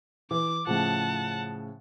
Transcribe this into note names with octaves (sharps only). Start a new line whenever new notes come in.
E3 D6
A2 C#3 F3 F#5 A5